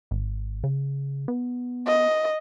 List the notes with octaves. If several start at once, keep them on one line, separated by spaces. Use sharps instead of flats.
G#1
C#3
B3
D#5